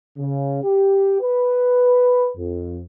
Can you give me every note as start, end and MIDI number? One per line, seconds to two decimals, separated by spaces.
0.18 0.60 49
0.63 1.18 67
1.21 2.30 71
2.37 2.81 41